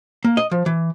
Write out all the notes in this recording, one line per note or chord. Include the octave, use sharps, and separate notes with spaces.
A#3
D#5
F3
E3